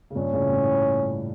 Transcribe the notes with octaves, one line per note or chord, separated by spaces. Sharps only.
C#3
G2 A#2 C#4
A2 C#3
A2